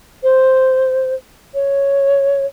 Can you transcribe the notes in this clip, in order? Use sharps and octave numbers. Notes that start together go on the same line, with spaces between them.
C5
C#5